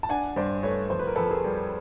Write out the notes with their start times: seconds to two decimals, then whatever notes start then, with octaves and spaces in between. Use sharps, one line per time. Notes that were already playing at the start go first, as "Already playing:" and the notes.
0.03 A5
0.09 D4 F#5 G#5
0.36 G2 C5 D5
0.63 A3 B4 C#5
0.90 F2 C5
0.99 B4
1.07 A#4
1.16 F2 A4 B4
1.31 G#4 A#4
1.44 G3